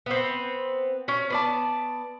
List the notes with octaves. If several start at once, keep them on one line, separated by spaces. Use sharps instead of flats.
B3 C4
C#4
B3 D5 A5